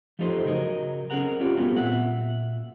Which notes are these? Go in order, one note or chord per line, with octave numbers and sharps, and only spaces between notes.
F3 G3 A3 D#4 A4 C5
C#3 F#3 A#4 D#5
C4 C#4 G#4 A#4 F#5 A#5
C#4 D4 F4 G4
F#3 G3 A3 B3 C4 F4
A#2 E5 F#5